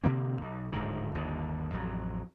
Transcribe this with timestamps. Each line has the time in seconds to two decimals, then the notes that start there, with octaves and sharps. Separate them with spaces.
0.04 B2 D3 A#3 C4
0.41 B1
0.72 D1 G#2 D3 D#3
1.15 G1 D#2 D3
1.73 A1 F2 F#3